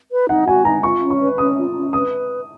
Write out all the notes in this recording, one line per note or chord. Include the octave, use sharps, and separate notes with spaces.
B4
D#4 F#5
F#4 G#5
D#4 A#5
F4 C#6
C#4
C#6
B4
C#4 D#6
F4
C#4
B4 D#6